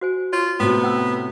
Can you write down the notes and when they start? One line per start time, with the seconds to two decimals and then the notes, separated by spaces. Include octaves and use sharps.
0.01 F#4 C5 G#5
0.33 F4 C#5 C#6
0.60 A2 C3 B3 F#4 G5
0.83 F#5 G5 E6